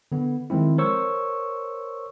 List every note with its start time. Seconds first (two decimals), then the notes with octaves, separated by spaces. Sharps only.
0.12 D3 B3
0.50 D#3 F3 G#3 C4 E4
0.78 A#4 C5 C#5 C#6 E6